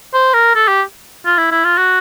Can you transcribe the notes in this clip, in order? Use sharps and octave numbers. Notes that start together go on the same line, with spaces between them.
C5
A#4
A4
G4
F4
E4
E4
F4
F#4